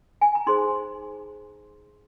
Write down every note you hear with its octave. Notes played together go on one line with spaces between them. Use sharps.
G#5
A#5
D#4 G#4 C5 C6